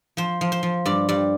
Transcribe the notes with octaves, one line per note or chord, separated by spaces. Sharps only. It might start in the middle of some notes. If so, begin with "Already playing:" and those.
F3 C5
F3
C5
F3
G2 D5
G2 D5